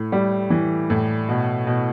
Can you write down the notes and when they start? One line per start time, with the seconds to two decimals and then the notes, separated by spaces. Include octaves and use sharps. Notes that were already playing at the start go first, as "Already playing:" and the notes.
Already playing: A2
0.12 G3
0.50 E3
0.90 A2
1.29 B2
1.67 B2